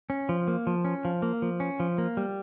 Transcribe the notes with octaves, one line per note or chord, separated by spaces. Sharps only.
C#4
F3
A#3
F3
C#4
F3
A#3
F3
C#4
F3
A#3
G3